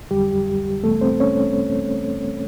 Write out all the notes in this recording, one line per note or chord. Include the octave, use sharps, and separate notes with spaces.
F2 D3 F#3 G3 G4
F2 C3 E3 G3 A3 B3 A4
C4 C5
C#4 C#5